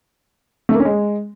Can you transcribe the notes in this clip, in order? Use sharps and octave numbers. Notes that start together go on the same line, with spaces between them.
A3
A#3
C#4
G#3